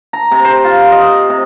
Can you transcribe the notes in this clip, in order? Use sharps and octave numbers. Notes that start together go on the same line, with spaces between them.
A#5
C3
C5
F4
D#5
C3